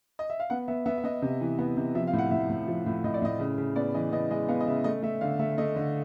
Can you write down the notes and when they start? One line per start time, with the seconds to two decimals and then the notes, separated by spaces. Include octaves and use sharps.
0.19 D#5
0.30 E5
0.40 F5
0.50 B3 F#5
0.68 B3 E5
0.86 B3 E5
0.98 E5
1.04 B3 D#5
1.22 C3
1.41 E3
1.59 B3
1.77 C3
1.95 F3 E5
2.07 F5
2.13 A2
2.19 F#5
2.31 A2 E5
2.49 A2
2.68 F3
2.86 A2
3.04 A2 D#5
3.14 D5
3.22 A2 D#5
3.39 C#3
3.58 C#3
3.76 B3 D5
3.94 E3 D#5
4.12 B3 D#5
4.30 G#3 D#5
4.49 B3 F5
4.61 D#5
4.67 C#3 E5
4.84 A3 D#5
5.02 A3 E5
5.21 D3 F5
5.39 A3 E5
5.58 A3 D#5
5.76 D3